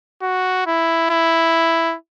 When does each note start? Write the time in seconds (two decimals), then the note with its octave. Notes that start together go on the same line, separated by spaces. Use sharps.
0.22 F#4
0.66 E4
1.10 E4